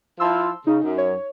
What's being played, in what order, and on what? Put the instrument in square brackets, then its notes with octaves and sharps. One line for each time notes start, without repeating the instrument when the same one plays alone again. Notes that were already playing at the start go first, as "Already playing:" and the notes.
[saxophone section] F3 E4 F4 [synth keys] A5 C6 E6
[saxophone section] C#3 [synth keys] D#4
[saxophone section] F#2
[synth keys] C#5